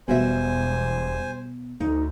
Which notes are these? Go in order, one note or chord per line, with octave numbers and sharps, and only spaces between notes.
E1 B2 G3 B3 F#4 C5 E5 G#5
D2 D#4